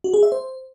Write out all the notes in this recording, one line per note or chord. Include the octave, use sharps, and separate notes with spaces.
F#4
G#4
E5
C5